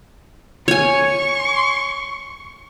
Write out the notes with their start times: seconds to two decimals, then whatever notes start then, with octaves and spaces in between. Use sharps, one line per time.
0.68 C#5 G#5 C#6